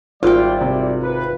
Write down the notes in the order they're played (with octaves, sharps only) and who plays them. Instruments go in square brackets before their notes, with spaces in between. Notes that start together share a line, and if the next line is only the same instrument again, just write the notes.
[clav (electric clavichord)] G#1 [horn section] G3 E4 D5 [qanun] F4 G5
[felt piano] C3
[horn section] B4